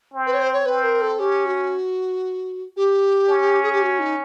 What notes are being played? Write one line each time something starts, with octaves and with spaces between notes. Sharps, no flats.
C4
B4
C#5
C5
C#5
C4 B4
A#4
A4
C#4 G4
F#4
G4
C#4
G#4
G4
F#4
D#4